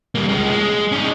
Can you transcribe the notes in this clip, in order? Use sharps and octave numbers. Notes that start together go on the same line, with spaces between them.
G3 A#3
G#3 C#4
G#3
C#4 D#4